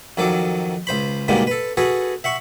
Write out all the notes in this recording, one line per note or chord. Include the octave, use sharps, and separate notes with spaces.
F2 D#3 F#3 A4 D6
C#2 C5 B5
G#2 B2 D3 G3 G#3 A#3
A4 B4
F#4 G#4 A4 B4
E5 F#5 C#6